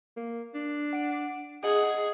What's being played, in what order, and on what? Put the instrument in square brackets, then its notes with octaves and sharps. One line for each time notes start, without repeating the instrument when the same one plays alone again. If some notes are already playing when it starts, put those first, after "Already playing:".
[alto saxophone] A#3
D4
[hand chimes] F#5 D7
[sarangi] G#4 [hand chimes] D#5 [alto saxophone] F#5